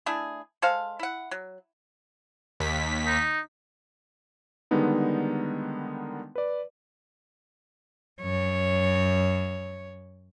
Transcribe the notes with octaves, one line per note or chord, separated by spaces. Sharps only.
A3 D4 E4 G#4
G#3 A4 C5 F5
E4 F#5
F#3
D#2 B6
D#4
D3 D#3 G3 G#3 B3 D#4
B4 D5
F#2 C#5